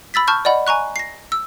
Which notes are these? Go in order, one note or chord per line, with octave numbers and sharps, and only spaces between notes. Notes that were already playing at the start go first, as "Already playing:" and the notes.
B5 E6 A6 B6
A5 C#6 F6 G6
D5 D#5 F#5 B5
G#5 A#5 C#6 F#6
A#6 C7
E6